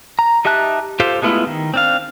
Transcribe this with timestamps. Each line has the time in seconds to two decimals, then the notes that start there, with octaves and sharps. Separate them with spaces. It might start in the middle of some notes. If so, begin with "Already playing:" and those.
0.19 A#5
0.45 D#4 G4 E5 A5 F#6
1.00 F4 G4 A4 C5 F5
1.22 G#3 A3 B3 E4 F4
1.47 D#3
1.74 C4 D4 F5